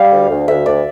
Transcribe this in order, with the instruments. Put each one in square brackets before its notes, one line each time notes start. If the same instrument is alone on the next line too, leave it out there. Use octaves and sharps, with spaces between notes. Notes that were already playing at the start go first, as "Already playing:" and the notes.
Already playing: [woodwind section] G3 [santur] F5
[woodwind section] D2
D2
[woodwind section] D2 [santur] E5
[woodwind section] D2 [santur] D5